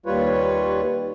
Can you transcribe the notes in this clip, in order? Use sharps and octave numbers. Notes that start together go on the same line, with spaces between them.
D#2 G3 F4 B4 C#5